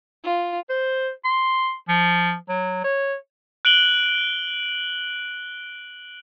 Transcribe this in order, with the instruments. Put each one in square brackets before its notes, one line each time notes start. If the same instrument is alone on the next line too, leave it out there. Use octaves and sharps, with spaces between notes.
[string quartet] F4
[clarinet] C5
C6
F3
F#3
C#5
[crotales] F#6 D7 F#7 G7